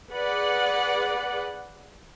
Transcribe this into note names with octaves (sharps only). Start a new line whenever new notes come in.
G#4 B4 D5 F#5